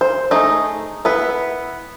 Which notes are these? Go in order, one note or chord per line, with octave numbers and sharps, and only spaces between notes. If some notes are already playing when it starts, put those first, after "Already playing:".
C5
A3 D#4 G#4
B3 E4 B4